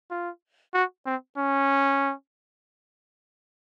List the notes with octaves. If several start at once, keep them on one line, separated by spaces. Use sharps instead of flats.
F4
F#4
C4
C#4